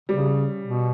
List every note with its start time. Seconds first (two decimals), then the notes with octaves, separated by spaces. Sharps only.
0.09 C#3 G3
0.63 B2